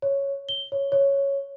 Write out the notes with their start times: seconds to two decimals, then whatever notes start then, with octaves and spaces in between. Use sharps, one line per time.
0.02 C#5
0.49 G7
0.72 C#5
0.92 C#5